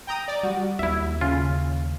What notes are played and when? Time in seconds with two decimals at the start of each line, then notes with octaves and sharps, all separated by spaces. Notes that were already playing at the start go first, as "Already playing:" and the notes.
0.07 G5 A#5 D#6
0.28 D5
0.43 G3 F#4
0.79 D#2 E4 E5
1.21 C#3 C#4 F4